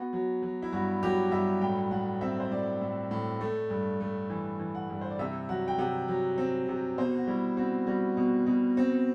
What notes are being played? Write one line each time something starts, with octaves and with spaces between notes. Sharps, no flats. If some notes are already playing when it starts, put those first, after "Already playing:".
Already playing: B3 F#4
F#3
F#3
E4
G2 F#4
F#3 G4
G2 E5
A2 G5
A2 F#5
C4 E5
C5
A2 D5
A2
A2
A3
G2
A3
E3
E3
F#5
G2
C5
D5
C3 E5
F#3 F#5
G5
C3 F#5
F#3
C4
C3
B2 C5
F#4
G3 E4
C4 F#4
G3 F#4
B2
B2
C4